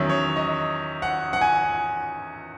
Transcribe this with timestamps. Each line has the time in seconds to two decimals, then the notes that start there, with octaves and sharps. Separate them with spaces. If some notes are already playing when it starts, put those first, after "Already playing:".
Already playing: E2 D#3 F#3 C#4 E5
0.09 C#5
0.36 D#5
1.02 F#5
1.33 F#5
1.41 G#5